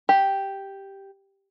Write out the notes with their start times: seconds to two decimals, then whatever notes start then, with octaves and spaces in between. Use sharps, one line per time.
0.09 G4